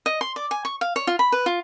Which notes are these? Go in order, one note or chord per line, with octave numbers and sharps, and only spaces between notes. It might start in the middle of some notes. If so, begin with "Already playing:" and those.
D#5
C6
D5
G#5
C#6
F5
C#5
F4
B5
B4
F4